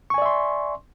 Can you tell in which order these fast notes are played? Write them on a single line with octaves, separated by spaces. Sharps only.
C#6 G#5 D5 E5 C6